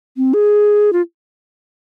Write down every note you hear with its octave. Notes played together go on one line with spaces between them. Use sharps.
C4
G#4
F4